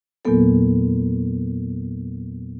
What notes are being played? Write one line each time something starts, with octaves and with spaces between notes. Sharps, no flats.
E2 A#2 F#3 A#3 B3 A4